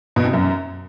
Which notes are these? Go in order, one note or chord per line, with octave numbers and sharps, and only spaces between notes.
B2
C3
F#2